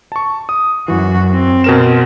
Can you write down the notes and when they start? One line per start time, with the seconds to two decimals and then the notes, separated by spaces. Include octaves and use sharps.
0.12 A5 C#6
0.49 D#6
0.88 F#2 E3 F#4
1.32 C4
1.64 B2 A#4 E7